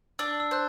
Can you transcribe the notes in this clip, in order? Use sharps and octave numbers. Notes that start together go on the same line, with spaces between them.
D4 E6
E6
C5 F#6